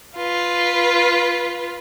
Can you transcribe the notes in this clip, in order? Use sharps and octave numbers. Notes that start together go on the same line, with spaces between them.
F4 B4